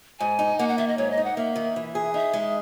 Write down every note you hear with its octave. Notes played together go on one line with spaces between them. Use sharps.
G#2 G#5
D#4
A#3 F#5
F#5
D#3 E5
D#5
G#2 C#5
D#5
D#4
F#5
A#3 E5
D#3
E3
G#4
D#4 E5
G#3